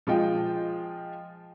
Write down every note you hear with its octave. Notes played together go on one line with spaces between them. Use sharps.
F3 G#3 F4 D#5 G5